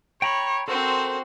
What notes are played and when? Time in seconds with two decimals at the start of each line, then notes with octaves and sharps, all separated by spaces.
0.22 C#5 G5 A#5 B5
0.68 C4 F#4 A4 A#4 C5